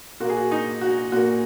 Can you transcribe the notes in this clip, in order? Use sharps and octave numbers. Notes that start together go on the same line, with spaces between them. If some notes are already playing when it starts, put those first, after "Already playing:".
A#2 A#3 F#4
G#4
F#4
D#4
F#4
A#2 A#3 F#4